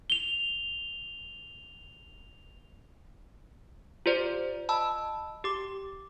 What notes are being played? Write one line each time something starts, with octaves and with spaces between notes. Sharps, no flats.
F7 G7
F4 G4 C5 D5
D#5 A5 B5 E6
G4 D6